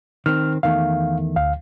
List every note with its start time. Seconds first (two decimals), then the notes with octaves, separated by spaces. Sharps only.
0.26 D#3 C4 F6
0.63 E2 D#3 A3 F5
1.36 D2 F5